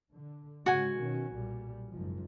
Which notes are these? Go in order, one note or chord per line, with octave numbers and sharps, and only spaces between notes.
D3
G#2 C#3 G#3 F#4 G#5
B2 D#3 C#4
B1 A#2 G3
F#1 G#2 F3